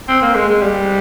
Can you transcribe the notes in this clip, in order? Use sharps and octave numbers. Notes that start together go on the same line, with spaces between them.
C4
A#3
G#3
G#3
G3